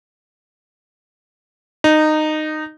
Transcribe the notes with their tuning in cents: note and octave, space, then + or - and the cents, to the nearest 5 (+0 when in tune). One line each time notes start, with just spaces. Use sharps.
D#4 -15